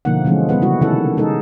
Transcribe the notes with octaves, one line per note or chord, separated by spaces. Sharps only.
B2 D3 F3 A#3 D#4 F#5
D3 E3 F3 G#3 A3 C#4
G3 B3 G#4 B4 F#5
C#3 G3 E4 F#4
C3 D#3 C#4 E4 A4 F#5
G#3 D#4 G#4 A4